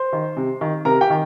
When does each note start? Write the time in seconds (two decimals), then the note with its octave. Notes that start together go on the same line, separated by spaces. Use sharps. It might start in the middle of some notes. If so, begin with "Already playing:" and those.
Already playing: C5 C6
0.13 D#3
0.37 C3
0.61 D#3
0.85 C3 A#4 A#5
1.01 G4 G5
1.10 D#3